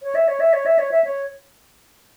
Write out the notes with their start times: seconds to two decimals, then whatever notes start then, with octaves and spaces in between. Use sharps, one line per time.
0.02 C#5
0.15 E5
0.28 C#5
0.40 E5
0.53 C#5
0.66 E5
0.79 C#5
0.91 E5
1.04 C#5